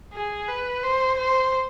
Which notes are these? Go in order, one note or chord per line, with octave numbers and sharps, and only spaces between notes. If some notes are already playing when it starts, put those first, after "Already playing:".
G#4
B4
C5
C5